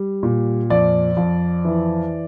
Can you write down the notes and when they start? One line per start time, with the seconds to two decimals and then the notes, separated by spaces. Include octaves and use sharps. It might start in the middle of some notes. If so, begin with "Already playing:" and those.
Already playing: G3
0.23 A#2
0.70 F2 D5
1.17 F2
1.65 E3